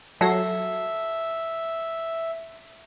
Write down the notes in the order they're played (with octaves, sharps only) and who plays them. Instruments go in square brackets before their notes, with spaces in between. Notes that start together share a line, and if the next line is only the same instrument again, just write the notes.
[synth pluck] F#3 A#6 C7 [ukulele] A4 [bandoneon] E5